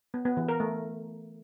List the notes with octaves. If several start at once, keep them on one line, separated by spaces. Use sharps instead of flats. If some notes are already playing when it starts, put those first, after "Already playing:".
B3
B3
E3
A#4
A3